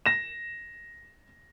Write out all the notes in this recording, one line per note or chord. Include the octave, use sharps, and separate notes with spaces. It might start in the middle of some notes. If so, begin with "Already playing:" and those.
A#6 E7